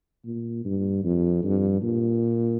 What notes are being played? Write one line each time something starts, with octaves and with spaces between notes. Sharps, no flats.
A#2
G2
F2
G2
A#2